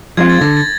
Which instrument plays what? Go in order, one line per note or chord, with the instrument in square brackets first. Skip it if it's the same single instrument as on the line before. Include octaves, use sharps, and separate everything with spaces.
[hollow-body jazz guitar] F3 G#3 C4 F4 [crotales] G#6
[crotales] A6
[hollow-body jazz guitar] D3 [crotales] A#6
[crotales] A6